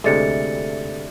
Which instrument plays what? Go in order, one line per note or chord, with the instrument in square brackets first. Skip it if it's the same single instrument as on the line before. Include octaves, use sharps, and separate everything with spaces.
[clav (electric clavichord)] D2 C3 G#3 [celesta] A4 A6 C#7 [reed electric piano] D5 E5